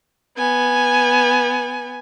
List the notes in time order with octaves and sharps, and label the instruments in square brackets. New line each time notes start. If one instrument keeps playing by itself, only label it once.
[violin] B3 G#5